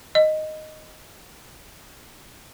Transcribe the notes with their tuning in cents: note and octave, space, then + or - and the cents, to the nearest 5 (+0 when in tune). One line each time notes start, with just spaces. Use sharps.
D#5 -5